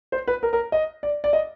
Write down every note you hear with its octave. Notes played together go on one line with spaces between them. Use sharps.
C5
B4
A#4
A#4
D#5
D5
D5
D#5